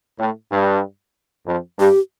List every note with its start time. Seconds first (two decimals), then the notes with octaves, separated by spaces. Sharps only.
0.20 A2
0.52 G2
1.47 F2
1.79 G2 G4